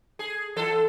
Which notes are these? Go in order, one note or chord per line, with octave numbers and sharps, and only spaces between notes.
G#4
E3 A4